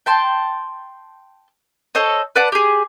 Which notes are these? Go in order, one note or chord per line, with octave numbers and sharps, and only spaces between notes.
G5 A5 C6
A4 C5 C#5 D#5
B4 D5 F#5 A5
G4 G#4